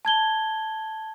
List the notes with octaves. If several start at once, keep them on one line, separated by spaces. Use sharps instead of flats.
A5 G#6 G7